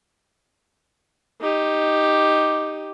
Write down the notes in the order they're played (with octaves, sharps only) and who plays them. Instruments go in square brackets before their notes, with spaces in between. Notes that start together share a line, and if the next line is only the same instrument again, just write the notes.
[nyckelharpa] D#4 G4